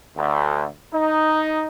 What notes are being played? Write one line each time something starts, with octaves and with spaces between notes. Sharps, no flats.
D2
D#4